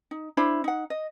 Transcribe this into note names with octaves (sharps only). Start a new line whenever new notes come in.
D#4
D4 E4 C5 B5
D#4 F#5
D#5